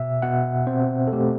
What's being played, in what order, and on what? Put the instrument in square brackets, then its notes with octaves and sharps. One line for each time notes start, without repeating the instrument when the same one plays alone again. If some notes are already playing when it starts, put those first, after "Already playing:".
Already playing: [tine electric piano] B2 E5
B2 F#5
C4 C5
A4
A3 G4